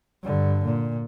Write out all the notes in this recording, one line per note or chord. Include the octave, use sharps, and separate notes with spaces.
G2 D3
A#2